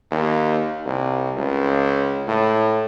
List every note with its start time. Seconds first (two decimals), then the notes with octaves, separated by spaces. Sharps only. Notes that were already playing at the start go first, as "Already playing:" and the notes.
0.12 D#2
0.86 C2
1.37 C#2
2.28 A2